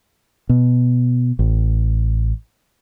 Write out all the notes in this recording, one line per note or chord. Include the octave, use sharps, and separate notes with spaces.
B2
A1